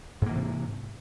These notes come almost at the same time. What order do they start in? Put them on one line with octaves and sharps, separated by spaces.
G#2 A#3 E3 C3